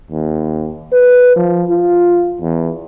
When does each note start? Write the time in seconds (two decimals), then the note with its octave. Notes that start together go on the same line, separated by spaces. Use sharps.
0.11 D#2
0.93 B4
1.36 F3
1.70 F4
2.42 E2